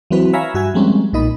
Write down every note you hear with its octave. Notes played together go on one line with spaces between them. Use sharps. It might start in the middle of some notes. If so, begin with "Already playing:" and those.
E3 F#3 C4 F#4 B4
C#5 E5 F5 G#5 A#5 B5
G2 F#4 E5 G#5
F3 G3 G#3 A#3 C4 C#4
B1 A#2 D#4 D#5 B5